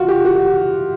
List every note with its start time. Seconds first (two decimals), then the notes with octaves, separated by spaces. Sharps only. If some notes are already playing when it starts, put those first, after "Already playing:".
Already playing: F4 F#4
0.08 G4
0.25 F#4